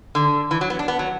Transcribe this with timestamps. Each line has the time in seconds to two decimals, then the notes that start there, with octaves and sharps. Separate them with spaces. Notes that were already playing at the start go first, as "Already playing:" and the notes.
0.15 D3
0.51 E3
0.61 F#3
0.70 B3
0.79 D4
0.88 B3
0.99 F#3